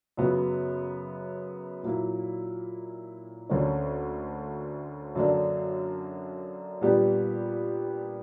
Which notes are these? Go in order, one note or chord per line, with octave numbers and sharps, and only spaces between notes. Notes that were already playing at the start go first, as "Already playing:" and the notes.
F#2 C#3 F#3 B3 F#4
A#2 F#3 A#3 E4
D2 D3 A#3 C#4
F#2 D3 F#3 A#3 D4
A#2 G3 B3 D4 G4